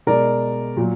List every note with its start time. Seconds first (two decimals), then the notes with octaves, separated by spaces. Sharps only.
0.07 B2 G#3 A#4 D5
0.77 A#2 F#3